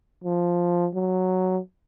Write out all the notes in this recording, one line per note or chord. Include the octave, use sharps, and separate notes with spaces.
F3
F#3